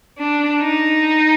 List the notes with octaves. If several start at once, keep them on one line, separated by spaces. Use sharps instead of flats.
D4
D#4